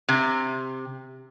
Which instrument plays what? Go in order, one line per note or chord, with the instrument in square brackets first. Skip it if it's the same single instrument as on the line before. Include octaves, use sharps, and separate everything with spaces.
[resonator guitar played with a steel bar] C3